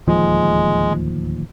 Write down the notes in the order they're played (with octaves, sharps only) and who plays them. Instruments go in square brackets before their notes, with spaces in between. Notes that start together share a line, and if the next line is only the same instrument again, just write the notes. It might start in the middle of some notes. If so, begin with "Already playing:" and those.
[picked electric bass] D1 D#2 F3 [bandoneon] G#3